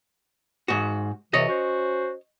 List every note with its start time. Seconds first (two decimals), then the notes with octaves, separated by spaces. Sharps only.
0.68 G#2 F#4
1.33 F2 C3 E3 C#5 D#5
1.49 C#4 F#4 C5